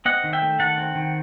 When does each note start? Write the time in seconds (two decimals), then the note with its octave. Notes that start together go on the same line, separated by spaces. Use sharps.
0.05 C4 D#5 F#5
0.24 D#3
0.33 E5 G5
0.42 A3
0.59 D#3 F#5 A5
0.78 C4
0.95 D#3